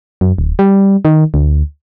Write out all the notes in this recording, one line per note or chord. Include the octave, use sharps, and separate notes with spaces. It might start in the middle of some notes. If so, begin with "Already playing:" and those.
F#2
D1
G3
D#3
D2